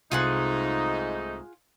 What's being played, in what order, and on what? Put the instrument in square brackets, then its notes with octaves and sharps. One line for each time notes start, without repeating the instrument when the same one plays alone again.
[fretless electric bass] C2 C3 [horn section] G#2 A3 D#4 [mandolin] F4 G#4 F#5